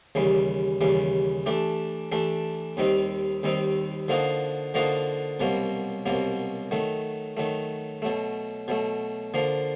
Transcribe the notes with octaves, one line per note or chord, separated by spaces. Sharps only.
D#2 C#3 E3 G3
D#2 C#3 E3 G3
E3 A3 D4 G4
E3 A3 D4 G4
D#2 D#3 G3 C4 D#4
D#2 D#3 G3 C4 D#4
D3 F3 A#3 D#4 F#4
D3 F3 A#3 D#4 F#4
C2 B2 F#3 A#3
C2 B2 F#3 A#3
D#3 F#3 A3
D#3 F#3 A3
B2 F#3 A3
B2 F#3 A3
D3 F3 A#3